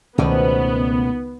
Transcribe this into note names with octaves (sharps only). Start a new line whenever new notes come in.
C#2 B2 D#3 A3 B3 C#4 C5 D5